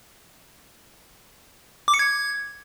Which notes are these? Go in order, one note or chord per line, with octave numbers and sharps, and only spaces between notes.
D6
C#7
G#6